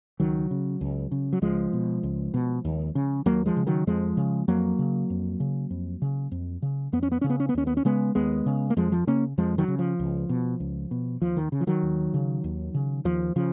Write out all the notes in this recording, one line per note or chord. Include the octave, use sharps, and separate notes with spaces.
C#2 D#3 F#3
C#3
C#2
C#3
F#3
C#2 F3 G#3
B2
C#2
B2
D#2
C#3
D#2 F#3 A#3
F3 G#3
C#3
D#3 F#3
F2 F3 G#3
C#3
F2 F#3 A#3
C#3
F2
C#3
F2
C#3
F2
C#3
F2 B3
C#4
B3
C#3 C#4
B3
C#4
B3
D#2 C#4
B3
C#4
C#3 G#3 B3
D#2 G#3 B3
C#3
A#3
F2 F3 G#3
F3
C#3 A#3 C#4
F2 F3 G#3
D#3 F#3
C#3
F3
C#2
B2
C#2
B2
D#2 F3
D#3
C#3
F3
D#3 F#3
D#2
C#3
D#2
C#3
D#2 F3
C#3 F3